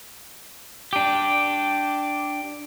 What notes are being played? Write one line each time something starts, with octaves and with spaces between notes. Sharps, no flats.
D4 G4